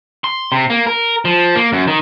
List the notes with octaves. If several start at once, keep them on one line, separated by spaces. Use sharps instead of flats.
C6
C3
A#3
A#4
F3
A#3
F#2
D#3